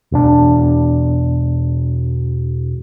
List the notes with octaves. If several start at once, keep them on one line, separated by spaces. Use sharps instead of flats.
E1 D4